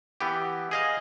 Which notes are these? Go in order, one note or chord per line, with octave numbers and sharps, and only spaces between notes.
E3 B3 G4
G#4 D#5 F5